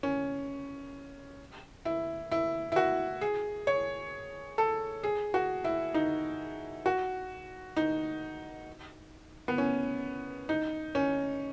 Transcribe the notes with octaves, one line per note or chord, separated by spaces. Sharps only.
C#4
E4
E4
E4
F#4
G#4
C#5
A4
G#4
F#4
E4
D#4
F#4
D#4
B3
C#4
D#4
C#4